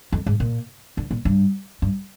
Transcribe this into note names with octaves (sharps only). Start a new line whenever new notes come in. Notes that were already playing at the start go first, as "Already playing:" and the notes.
F2
G#2
A#2
D3
A#2
G2
G2